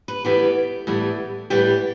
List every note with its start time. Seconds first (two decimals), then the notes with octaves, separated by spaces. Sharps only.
0.08 B4
0.24 A2 E3 G3 B3 G4
0.87 A2 E3 G3 B3
1.50 A2 E3 G3 B3 G4